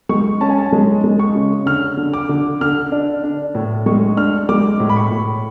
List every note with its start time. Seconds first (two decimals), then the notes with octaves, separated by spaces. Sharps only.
0.09 G#3 C#6
0.41 C#4 A5
0.50 G#5
0.59 A5
0.72 G#3
1.04 G#3
1.19 C#6
1.35 C#3
1.66 D3 F6
1.97 D3
2.13 D6
2.29 D3
2.61 D3 F6
2.92 D4
3.24 D4
3.55 A2
3.86 G#3 C#6
4.17 D4 F6
4.49 G#3 D6
4.80 A2
4.89 B5
4.96 C#6
5.11 A2